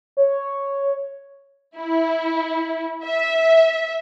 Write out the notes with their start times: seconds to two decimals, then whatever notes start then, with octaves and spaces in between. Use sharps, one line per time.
0.17 C#5
1.77 E4
3.05 E5